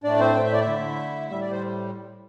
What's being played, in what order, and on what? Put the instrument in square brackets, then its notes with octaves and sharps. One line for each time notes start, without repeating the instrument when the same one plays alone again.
[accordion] A2 A3 D4 D5
C4 C5
G5
E5
D5
E4 E5
D3 A3
A2 G3 E5
D5
C5